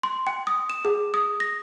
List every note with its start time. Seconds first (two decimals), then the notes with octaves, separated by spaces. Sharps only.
0.03 C6
0.27 G5
0.47 D#6
0.70 E7
0.85 G#4
1.14 D#6
1.40 A#6